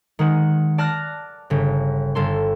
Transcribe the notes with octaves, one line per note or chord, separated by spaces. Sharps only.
D#3 G#3 F#5
D5 A5 F6 F#6 A#6
G1 C#3
G1 A4 C6